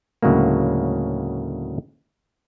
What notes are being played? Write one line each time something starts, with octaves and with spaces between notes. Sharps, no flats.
D2 A2 C#3 F#3 G#3 A#3